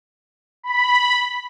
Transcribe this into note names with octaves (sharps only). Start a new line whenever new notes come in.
B5